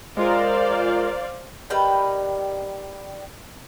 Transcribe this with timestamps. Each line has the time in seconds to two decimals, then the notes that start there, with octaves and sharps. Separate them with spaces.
0.17 G#3 F4 A#4 C5 D5 F5
1.70 D#3 G3 B4 G5